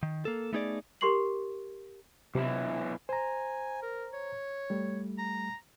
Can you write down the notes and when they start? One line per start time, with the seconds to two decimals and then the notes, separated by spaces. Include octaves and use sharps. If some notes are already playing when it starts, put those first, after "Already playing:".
0.03 D#3
0.25 A#3 A4
0.53 A3 B3 D#4 G#4 C5 D5
1.01 G4 A#4 C6 C#6 C7 F#7
2.35 B1 C3 E3
3.09 C5 G#5 A#5
3.83 A#4
4.13 C#5
4.70 G3 A3
5.18 A#5